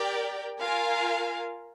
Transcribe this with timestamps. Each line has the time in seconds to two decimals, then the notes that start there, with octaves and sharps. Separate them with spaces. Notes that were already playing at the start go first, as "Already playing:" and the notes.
Already playing: G4 A#4 D5 G5
0.59 F4 A#4 F5 G#5